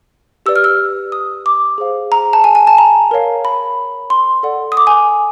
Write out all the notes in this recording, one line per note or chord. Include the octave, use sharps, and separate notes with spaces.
G4 B4 D5 E6
F6
E6
D#6
D6
G#4 C5 F5
A#5
A5
G#5
G#5
A5
A#5
A#4 C#5 F5
B5
C6
A4 D5 F#5
D#6
D6
G#5